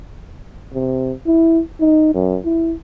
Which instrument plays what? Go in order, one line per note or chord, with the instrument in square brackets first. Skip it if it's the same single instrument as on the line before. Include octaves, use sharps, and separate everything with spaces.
[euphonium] C3
E4
D#4
F#2
E4